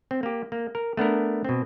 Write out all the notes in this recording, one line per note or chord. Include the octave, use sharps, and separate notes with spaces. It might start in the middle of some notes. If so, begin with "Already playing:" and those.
C4
A#3 G4
A#3
A#4
A3 B3 D4 A#4
B2 C4